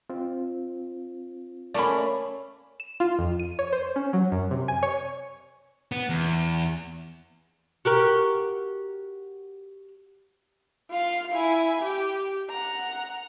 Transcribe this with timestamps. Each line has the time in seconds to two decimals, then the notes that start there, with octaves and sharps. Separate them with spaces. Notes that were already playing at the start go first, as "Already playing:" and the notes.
0.09 C4 F4
1.74 A3 A#3 C#4 D5 B5
2.80 E7
3.00 F4
3.19 F2
3.39 D#7
3.59 C#5
3.73 C5
3.96 C#4
4.13 F#3
4.32 F#2
4.51 C3
4.68 G#5
4.83 C#5
5.92 B3
6.09 E2
7.85 F#4 G4 A#4
10.90 F4 F5
11.33 E4 G#5
11.82 G4
12.51 F#5 A#5